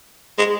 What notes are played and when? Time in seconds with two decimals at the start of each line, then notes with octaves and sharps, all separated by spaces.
0.38 G#3